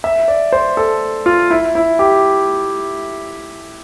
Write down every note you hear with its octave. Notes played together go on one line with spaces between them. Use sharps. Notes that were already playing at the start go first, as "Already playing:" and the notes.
E5
D5
C5
A4
F4
E4
E4
G4